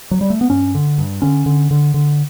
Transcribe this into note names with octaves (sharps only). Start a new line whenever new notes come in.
F#3
G3
A3
B3
G2 C#4
D3
G2
D3 C#4
D3
D3
D3